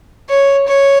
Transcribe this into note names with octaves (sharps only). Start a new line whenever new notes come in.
C#5
C#5